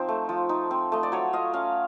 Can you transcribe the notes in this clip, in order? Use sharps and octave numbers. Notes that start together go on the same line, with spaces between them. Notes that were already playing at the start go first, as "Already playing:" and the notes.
Already playing: F3 C4 D#4 C5
A3
F3
D#4
C4
A3 D#5
D5
F#3 C#5
F4 D#5
C#4 F5